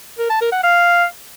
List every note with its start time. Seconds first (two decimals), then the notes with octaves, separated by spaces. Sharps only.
0.18 A#4
0.30 A5
0.41 A#4
0.52 F#5
0.63 F5